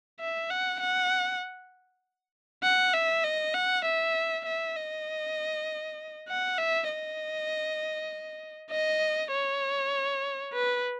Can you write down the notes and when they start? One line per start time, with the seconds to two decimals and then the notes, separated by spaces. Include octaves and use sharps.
0.20 E5
0.50 F#5
0.81 F#5
2.63 F#5
2.94 E5
3.24 D#5
3.54 F#5
3.86 E5
4.46 E5
4.76 D#5
6.29 F#5
6.58 E5
6.89 D#5
8.71 D#5
9.32 C#5
10.53 B4